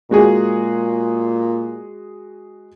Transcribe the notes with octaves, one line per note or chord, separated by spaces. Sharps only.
A#2 G#3 F#4 G#4